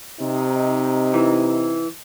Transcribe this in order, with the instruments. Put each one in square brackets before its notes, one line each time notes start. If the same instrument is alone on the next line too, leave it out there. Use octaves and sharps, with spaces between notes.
[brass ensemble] C3 D#4
[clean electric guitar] E3